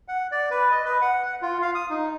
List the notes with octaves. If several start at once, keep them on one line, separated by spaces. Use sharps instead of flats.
F#5
D5
B4
D#5
B4
F#5
F#5
F4
F5
D#6
D#4